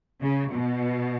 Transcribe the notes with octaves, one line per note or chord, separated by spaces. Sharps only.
C#3
B2